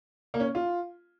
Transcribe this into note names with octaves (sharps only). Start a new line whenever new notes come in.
A#3
C#4
F4